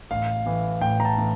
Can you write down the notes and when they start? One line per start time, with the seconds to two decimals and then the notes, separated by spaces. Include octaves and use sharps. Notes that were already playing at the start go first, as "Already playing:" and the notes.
0.11 A1 F5
0.46 A2 E3
0.81 A1 G5
1.00 A#5
1.05 A5
1.17 A2 E3